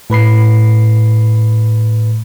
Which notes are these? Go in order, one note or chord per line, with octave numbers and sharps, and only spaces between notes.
A2 B4 B5 C7